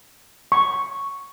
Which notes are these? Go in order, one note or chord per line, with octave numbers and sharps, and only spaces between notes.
C#6